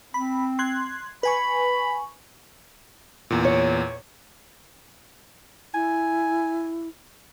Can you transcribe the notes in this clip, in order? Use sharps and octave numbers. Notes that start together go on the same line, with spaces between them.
C4 B5
C6 F#6 G#6
B4 G#5 B5 C#6
E2 A#2
C#5
E4 G#5